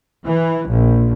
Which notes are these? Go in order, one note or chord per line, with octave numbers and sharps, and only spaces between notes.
E3
A#1